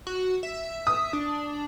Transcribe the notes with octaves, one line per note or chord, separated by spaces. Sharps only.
F#4
E5
D#6
D4